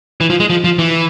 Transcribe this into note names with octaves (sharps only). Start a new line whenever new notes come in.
E3
F3
G#3
F3
F3
E3